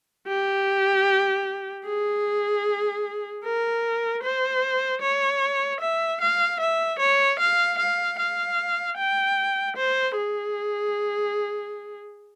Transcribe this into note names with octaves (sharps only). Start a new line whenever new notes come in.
G4
G#4
A#4
C5
C#5
E5
F5
E5
C#5
F5
F5
F5
G5
C5
G#4